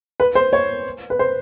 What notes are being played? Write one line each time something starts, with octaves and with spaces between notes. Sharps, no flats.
B4
C5
C#5
B4
C5